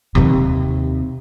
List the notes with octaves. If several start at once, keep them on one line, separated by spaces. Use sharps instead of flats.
D#2 C3